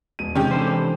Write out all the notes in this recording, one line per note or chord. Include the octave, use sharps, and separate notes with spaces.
E1 D#7
C3 D#3 G#3 C#4 G4
E3 D4 A4 C5